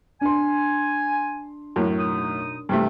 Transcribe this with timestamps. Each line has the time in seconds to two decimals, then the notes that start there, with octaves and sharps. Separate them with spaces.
0.21 D4 G#5 C6
1.76 F#2 A2
1.99 B2 D#4 D#6
2.69 G2 C3 A3